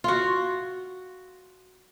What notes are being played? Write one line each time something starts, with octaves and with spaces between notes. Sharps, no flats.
F4 F#4